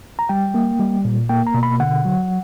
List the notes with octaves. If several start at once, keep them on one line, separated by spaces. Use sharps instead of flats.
A#5
G3 G5
A#3
G3
A#2
A#3 G5
A#5
B2
B5
D3 F#5
F#3